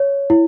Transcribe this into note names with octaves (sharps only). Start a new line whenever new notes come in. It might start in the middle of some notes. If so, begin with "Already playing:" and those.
Already playing: C#5
E4